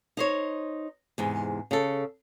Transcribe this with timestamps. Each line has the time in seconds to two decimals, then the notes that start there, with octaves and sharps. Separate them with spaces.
0.17 D#4 C5 C#5
1.18 E2 G#2 C3
1.71 C#3 A4